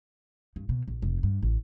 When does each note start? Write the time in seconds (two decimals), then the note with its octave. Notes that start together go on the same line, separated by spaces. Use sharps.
0.56 G2
0.69 B2
0.88 A#1
1.02 F1
1.23 G2
1.43 A1